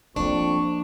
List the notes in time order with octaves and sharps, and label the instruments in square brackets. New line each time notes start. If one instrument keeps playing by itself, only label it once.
[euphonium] F2 [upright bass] F3 A#3 [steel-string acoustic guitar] D4 [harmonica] C#6